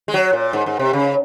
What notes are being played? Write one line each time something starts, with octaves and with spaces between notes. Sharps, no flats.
G#3
F#3
A#2
G#2
G#2
C3
C#3